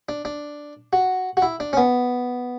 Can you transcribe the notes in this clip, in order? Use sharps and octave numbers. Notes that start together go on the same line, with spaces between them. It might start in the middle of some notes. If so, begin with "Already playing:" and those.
D4
D4
F#4
F#4
E4
D4
C#4
B3